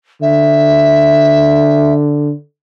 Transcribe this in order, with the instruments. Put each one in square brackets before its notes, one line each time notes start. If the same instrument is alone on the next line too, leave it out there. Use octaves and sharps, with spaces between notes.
[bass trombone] D3 [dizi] E5